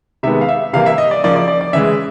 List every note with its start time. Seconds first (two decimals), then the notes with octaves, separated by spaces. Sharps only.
0.23 C3 D#3 G#3 B3 E5
0.41 F5
0.48 E5
0.73 C3 E3 G3 A#3 F5
0.86 E5
0.98 D#5
1.11 D5
1.23 C#3 F3 A#3 D5
1.36 D5
1.48 D5
1.61 D5
1.73 C#3 E3 G#3 E5